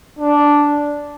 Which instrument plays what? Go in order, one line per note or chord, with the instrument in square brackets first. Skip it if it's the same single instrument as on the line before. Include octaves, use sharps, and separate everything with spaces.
[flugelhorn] D4